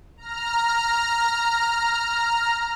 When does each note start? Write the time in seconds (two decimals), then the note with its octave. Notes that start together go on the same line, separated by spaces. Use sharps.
0.17 A#5 F6